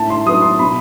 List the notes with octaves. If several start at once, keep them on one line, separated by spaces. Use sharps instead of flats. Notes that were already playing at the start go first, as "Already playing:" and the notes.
Already playing: A2 A5
C6
F#3 B3 D#6
C6
B2 B5